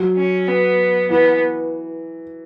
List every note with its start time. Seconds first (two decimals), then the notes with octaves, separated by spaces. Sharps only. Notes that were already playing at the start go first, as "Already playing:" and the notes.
Already playing: F#3
0.16 C#4
0.47 B3
1.10 E3 B3